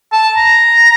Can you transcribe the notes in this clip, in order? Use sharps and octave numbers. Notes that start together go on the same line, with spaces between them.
A5
A#5